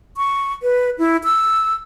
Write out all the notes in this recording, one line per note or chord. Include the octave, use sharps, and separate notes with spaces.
C#6
B4
E4
E6